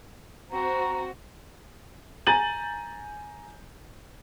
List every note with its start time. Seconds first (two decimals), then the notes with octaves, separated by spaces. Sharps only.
0.51 C4 F#4 A#5
2.27 G#5 A#5 G6 A6 D#7 F#7